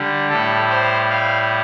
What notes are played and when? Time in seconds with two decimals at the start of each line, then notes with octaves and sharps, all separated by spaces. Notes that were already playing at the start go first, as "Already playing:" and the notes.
Already playing: D3 G3
0.30 A2 G3 A4
0.70 C5
1.10 F5